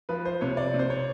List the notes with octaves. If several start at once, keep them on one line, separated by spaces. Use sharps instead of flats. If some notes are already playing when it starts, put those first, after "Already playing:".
F3 B4
C5
C3 C#5
D5
C3
C5
C#5